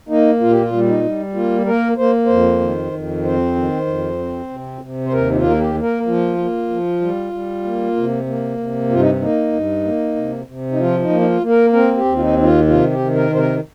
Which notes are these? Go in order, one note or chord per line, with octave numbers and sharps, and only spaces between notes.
A#3 D#4
A#2 F4
G4
F4
G3
D#4
G3
A#3 F4
A#3 A#4
A#3 C5
F2 C5
D#3
F2
C4 C5
D#3
F2
C4
C3
C3
C5
D#2 A#4
D#4
F4
A#3 A#4
G4
A#3
A#4
F3 F4
A#3
F3
G3
G3
A#3
C3
A#3
C3
G2 F4
D#4
A#3 D#4
G2
A#3
C3
C3
D#4
F3 F4
D#4
A#3
D#4
F4
A#3
A#4
C4 A#4
G4
D#2
F4
D#4
D#3 D#4
F4
C3 F4
G4
D#3
A#4
C3 C5
A#4